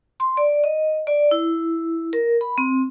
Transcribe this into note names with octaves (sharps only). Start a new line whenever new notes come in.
C6
D5
D#5
D5
E4
A#4
B5
C4